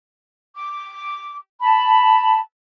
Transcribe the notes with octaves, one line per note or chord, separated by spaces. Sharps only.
D6
A5 B5